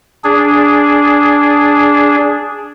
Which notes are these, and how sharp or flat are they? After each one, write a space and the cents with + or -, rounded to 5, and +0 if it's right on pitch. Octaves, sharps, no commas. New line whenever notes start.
D4 -10 G#4 +0